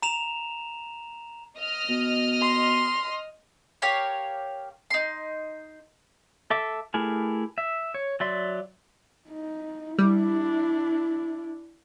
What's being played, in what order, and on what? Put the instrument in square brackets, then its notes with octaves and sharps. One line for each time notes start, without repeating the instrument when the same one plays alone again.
[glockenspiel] A#5 E7 F7
[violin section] D#5 F6
[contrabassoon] B2
[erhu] C6
[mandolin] G4 A#4 C#5 F5
D#4 C6
[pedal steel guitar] A4 E5 D6
A3 E4 G4 G#4 A#4
E5
C#5
F#3 D5 E5 C6
[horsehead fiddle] D#4
[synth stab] G3 [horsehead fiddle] D4 E4